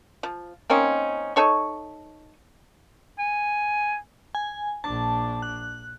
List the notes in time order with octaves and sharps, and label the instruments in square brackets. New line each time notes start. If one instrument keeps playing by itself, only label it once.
[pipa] F3
A#3 C4 C#4 D#4
D#4 A4 C#5 C#6
[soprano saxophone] G#5
[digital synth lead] G#5
[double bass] A#1 D4 [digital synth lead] A5
[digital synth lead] F#6